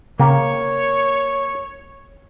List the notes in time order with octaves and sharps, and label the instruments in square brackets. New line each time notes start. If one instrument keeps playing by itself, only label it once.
[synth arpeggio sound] C#3 G5 [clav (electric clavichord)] A#3 [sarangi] C#5 [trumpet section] C#6